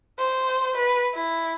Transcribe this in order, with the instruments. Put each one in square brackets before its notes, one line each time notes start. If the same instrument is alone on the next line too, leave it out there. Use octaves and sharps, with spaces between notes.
[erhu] C5
B4
E4